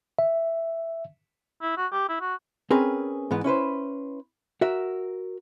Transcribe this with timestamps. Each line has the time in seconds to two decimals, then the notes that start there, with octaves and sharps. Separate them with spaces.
0.19 E5
1.62 E4
1.77 F#4
1.92 G4
2.09 E4
2.20 F#4
2.70 C4 C#4 G#4 A#4 B4
3.31 G#2 E3 B3
3.44 C#4 E4 B4 C5
4.61 F#4 A#4 E5